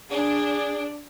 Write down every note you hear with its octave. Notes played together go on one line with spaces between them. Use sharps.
D4 G#4